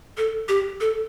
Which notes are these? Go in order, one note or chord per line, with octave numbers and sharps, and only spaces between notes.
A4
G4
A4